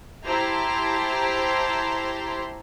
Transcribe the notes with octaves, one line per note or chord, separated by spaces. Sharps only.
E4 G4 C5 A5 A#5 C6